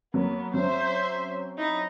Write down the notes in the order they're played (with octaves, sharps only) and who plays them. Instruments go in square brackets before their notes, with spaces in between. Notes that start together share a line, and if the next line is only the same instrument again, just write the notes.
[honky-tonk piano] F#3 A#3 [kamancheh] B3
[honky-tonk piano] F#3 C4 C#4 [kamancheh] C5 E5
[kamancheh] D#4 E4